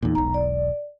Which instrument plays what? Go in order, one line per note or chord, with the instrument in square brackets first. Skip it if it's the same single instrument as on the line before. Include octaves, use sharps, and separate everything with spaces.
[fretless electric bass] E2 A#2 [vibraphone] D#4
[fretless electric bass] E1 B1 [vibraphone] A#5
[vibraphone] D5